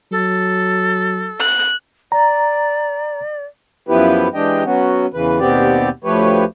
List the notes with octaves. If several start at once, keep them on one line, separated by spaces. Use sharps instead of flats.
F#3 A4
F#6
D5 A#5
F#2 F3 B3 E4 G4 B4
E3 G#3 D4 G4 D#5 G5
F#3 B3 C#4 F#4
E2 C#3 E3 B4
D#2 B2 B3 C4 G4 D5
D2 F3 A3 G4 B4 C#5